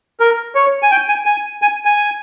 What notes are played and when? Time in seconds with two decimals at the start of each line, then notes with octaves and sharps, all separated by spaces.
0.20 A#4
0.55 C#5
0.82 G#5
0.91 G5
1.09 G#5
1.26 G#5
1.62 G#5
1.85 G#5